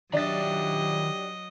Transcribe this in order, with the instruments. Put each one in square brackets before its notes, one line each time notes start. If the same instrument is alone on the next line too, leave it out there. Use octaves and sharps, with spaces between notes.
[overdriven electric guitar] D#3 E5 [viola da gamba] F#3 D#5 [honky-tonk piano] D4 A6 [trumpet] G4